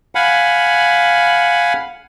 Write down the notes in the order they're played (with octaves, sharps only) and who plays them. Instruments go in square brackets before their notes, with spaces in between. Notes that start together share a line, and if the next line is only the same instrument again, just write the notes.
[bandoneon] F5 F#5 G#5 B5